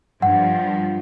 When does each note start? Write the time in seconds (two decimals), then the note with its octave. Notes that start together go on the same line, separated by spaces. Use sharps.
0.22 G2 F3 F#5